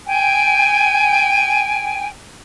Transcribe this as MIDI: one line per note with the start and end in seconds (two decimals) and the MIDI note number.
0.07 2.08 79
0.07 2.08 80